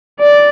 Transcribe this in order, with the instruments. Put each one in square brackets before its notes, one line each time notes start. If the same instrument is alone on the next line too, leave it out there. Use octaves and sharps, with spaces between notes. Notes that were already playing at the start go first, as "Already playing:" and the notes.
[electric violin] D5